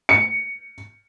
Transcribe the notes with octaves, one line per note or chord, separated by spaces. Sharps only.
C#7